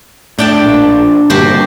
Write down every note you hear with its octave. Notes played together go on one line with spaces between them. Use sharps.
A2 D4 G5 A5
A#1
G2 A#2 D3 F#4 G4 C5